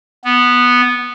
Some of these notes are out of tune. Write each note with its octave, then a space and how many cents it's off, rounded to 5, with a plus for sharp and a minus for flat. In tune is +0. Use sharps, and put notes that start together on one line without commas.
B3 -5